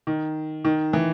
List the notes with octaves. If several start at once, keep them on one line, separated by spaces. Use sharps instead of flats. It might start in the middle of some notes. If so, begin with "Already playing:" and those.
D#3
D#3
E3